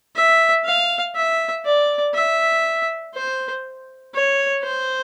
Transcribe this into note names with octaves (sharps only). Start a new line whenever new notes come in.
E5
F5
E5
D5
E5
C5
C#5
C5